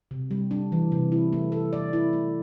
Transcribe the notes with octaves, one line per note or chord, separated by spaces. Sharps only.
C3
G3
D4
E3
C3
E4
A3
A4
D5
E4
A3